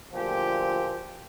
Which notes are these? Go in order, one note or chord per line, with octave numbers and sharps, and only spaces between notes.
D2 A#2 F3 G4